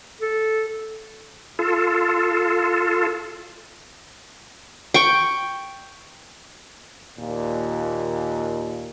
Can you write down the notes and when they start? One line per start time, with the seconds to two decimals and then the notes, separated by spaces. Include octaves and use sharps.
0.21 A4
1.59 F4 A4
4.94 G5 C#6
7.17 D#2 A#2